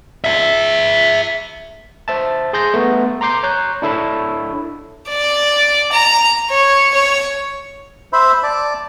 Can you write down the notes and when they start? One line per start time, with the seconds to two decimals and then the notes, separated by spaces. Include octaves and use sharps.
0.24 G#4 E5
2.08 C5 E5 A5
2.53 G#4 C6 G6 A#6
2.74 A3 B3
3.21 A#5 C6 D6 G6 C7
3.43 C#5 A#5 F#6 G6
3.82 D4 E4 A4 C#5 B5
5.09 D5
5.92 A#5
6.50 C#5
6.94 C#5
8.13 C5 E5 B5
8.43 D5 A5